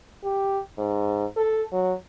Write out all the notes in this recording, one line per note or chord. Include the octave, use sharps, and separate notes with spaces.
G4
G#2
A4
F#3